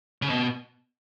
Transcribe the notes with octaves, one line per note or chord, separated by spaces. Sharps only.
C#3
B2